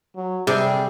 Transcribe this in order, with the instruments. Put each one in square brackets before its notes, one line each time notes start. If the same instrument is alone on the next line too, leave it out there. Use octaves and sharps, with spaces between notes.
[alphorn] F#3
[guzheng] C3 [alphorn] G3 [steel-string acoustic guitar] G#4